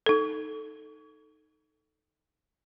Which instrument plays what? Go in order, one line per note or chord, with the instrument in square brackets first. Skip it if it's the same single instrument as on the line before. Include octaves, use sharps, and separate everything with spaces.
[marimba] D#4 A4